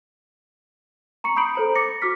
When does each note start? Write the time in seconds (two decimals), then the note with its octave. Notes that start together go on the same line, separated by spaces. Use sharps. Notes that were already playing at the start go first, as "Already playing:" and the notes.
1.24 A#5 C#6 C#7
1.36 B5 D#6 G6 C7 D7 F#7
1.55 A4 C5 A#5
1.75 D6 A6 A#6 C#7
2.02 F#4 D6 F6 B6